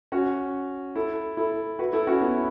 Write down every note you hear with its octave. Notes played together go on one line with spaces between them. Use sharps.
C#4 F#4
E4 A4
E4 A4
F#4 B4
E4 A4
C#4 F#4
B3 E4